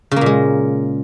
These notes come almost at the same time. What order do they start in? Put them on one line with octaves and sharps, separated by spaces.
C#3 A#3 A#2 G#3